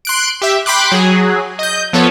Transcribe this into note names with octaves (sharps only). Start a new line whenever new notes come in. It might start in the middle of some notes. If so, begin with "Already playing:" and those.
C6 F#6 D7
G4 E5
G5 B5 C6 D6 F#6
F#3 G#4
D#5 G6
F3 B3 A4 C#5